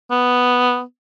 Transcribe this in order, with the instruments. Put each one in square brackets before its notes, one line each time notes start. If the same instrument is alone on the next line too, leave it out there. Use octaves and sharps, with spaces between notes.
[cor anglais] B3